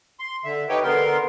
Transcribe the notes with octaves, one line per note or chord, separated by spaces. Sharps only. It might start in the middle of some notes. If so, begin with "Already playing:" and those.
C6
D3 E5
D#4 G4 B4 C#5 G5
D3 B3 A#4 C6